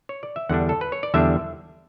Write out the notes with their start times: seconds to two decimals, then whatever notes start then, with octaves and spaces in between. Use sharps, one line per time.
0.09 C#5
0.23 D5
0.36 E5
0.49 E2 D3 G3 D4 F#5
0.69 A4
0.81 B4
0.92 C#5
1.03 D5
1.14 E2 D3 G3 D4 E5